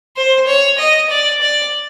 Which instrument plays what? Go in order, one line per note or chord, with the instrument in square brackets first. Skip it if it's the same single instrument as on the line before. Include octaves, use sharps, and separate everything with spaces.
[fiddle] C5
C#5
D#5
D5
D5